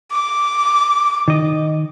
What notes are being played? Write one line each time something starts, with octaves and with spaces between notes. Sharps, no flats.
D6
D#3 D#5